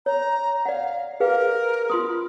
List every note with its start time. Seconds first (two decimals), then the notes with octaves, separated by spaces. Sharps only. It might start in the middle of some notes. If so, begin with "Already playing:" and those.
0.06 C#5 A#5
0.65 D5 F5 F#5
1.20 G#4 A#4 B4 F5
1.90 F4 C6 D#6